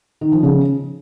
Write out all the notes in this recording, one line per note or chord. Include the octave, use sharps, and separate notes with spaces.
D#3
F3
C#3